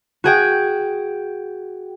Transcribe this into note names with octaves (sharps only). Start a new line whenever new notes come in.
F#4 G#4 G5